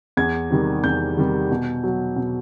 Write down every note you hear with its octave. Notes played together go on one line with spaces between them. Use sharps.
E2 G#6
C3 D#3 G3
E2 G6
C3 D#3 G3
B2
F#3
B2